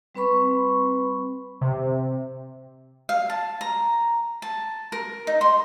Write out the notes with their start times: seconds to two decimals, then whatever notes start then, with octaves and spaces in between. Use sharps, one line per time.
0.15 G3 C4 B4 B5 C#6
1.61 C3
3.09 F5
3.30 A5
3.61 A#5
4.42 A5
4.92 A#4
5.27 D#4
5.41 C6